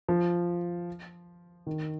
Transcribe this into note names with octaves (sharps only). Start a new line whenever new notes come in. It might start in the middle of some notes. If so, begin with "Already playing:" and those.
F3
D#3